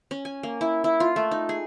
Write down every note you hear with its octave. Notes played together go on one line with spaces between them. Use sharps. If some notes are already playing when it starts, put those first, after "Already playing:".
C#4
G#5
A#3
E4
E4
F4
A3
D#4
G#4